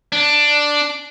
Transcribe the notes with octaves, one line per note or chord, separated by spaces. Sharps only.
D4